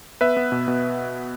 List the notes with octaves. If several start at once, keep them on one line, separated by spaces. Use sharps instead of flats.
B3 B4 E5
B3
B2
B2